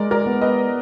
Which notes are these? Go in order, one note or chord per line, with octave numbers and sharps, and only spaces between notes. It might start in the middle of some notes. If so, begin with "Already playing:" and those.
Already playing: G#3 A#4 D5
A#4 D5
B3
B4 D#5